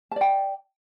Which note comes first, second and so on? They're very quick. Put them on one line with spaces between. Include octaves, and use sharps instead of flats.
A5 D5 G5